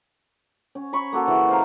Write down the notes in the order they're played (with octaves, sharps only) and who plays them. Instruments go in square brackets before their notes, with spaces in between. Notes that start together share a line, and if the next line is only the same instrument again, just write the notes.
[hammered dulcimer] C#4
C#5 B5 C#6
A#3 F#4 A4
C#3 E3
C5 F5 A#5